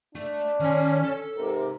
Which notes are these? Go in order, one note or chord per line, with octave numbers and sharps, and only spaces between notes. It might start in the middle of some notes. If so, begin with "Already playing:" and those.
A3 D4
D#3 C#4 C6
A4
G#2 C3 G4 A#4